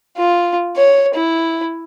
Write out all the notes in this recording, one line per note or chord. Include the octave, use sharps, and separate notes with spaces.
F4
C#5
E4